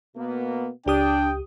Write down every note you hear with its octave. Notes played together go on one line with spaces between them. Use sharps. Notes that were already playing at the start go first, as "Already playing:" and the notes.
B2 A#3 B3
C#2 D4 G4 G5 D#6